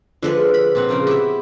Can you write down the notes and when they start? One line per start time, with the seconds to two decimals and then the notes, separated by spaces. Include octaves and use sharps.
0.22 D3 F3 G#3 A4 B4
0.54 B5
0.75 A#2 C4 F#5
0.89 C#3 F3 A#3
1.07 B3 E4 G4 E5